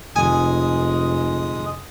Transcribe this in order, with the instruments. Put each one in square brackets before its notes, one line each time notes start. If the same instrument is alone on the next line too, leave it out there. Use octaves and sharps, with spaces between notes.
[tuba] F1 [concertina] G#3 D#6 [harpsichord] G#5